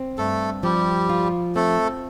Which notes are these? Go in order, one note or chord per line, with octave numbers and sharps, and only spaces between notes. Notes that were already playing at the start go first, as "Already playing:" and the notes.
Already playing: C4
G2 A3 A4
F3 G3 G4
F4
A3 C4 A4